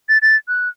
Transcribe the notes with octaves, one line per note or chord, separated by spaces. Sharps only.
A6
A6
F#6